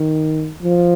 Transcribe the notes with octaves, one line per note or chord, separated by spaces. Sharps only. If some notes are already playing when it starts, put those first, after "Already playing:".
Already playing: D#3
F3